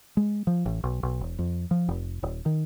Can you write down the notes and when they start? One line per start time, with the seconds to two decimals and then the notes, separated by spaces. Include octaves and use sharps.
0.17 G#3
0.47 F3
0.66 A1
0.84 B1
1.03 B1
1.21 E1
1.39 F2
1.71 F3
1.89 F1
2.23 D#1
2.46 D#3